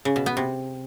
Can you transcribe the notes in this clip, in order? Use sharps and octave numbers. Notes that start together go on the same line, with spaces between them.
C#3
B2
B3
C3